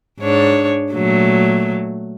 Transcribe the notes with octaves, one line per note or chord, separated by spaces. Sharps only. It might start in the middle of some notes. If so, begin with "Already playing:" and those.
G#2 D4 C#5
A#2 F#3 A3